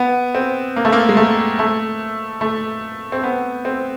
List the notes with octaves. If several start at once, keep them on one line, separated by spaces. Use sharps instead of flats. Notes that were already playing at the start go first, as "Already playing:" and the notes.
Already playing: B3
C4
A#3
A3
A#3
G#3
A3
A3
A3
C4
B3
C4